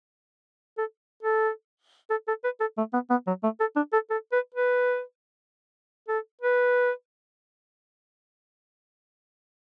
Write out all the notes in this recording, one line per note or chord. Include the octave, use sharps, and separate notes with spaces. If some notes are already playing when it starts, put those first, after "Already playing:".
A4
A4
A4
A4
B4
A4
A3
B3
B3
F#3
A3
A4
D4
A4
A4
B4
B4
A4
B4